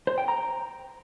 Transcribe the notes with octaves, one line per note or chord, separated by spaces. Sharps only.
C5
G5
A#5